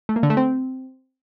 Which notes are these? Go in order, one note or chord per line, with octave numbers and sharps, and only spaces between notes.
A3
A#3
D3
A3
C4